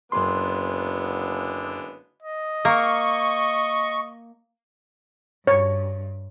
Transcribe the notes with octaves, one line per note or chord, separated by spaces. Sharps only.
F#1 F#2 D3 G#3 B3 C6
D#5
A#3 C#6
G2 C#5